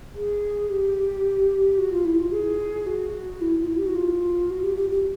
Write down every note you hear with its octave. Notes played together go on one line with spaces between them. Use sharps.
G#4
G4
F#4
F4
E4
F4
G#4
F#4
E4
F4
E4
G4
F#4
F4
F#4
G4
G4
G4